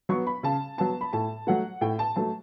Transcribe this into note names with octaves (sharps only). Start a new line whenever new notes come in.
F#3 B3 C#6
B5
C#3 A5
F#3 B3 A5
B5
A2 A5
F#3 A3 F#5
A2 G5
A5
F#3 A3 A5